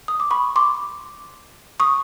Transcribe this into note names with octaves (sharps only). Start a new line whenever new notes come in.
D#6
D6
B5 C#6
C6 D6
C#6 D#6